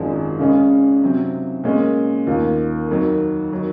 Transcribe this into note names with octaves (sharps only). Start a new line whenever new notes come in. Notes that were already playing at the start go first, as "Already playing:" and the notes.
Already playing: G#1 F#2 F3 G#3
C#3 G#3 C#4
C3 F#3 C4
A#2 G#3 C#4
D#2 D#3 A#3 F4
F2 D#3 F#3 A#3
D#3 F#3